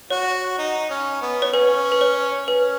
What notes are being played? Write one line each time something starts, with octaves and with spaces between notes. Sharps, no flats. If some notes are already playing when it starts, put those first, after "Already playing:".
F#4 C#5
D#4
C#4
B3
C#5
C#4 B4
B4
C#5
C#4 B4